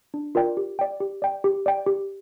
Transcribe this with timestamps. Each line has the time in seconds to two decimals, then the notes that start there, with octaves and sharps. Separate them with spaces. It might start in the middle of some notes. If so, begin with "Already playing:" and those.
0.14 D4
0.35 F4 A#4 D5 G5
0.57 G4
0.79 D5 G5
1.00 G4
1.22 D5 G5
1.44 G4
1.66 D5 G5
1.86 G4